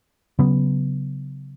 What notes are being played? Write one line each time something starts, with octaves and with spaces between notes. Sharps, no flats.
C#3 F#3 B3